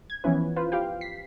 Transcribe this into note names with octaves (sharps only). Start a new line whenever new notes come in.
G#6
E3 F3 B3 C#4 E4 B4
F4 B4 C5
F4 G4 F5 G5
B6 C7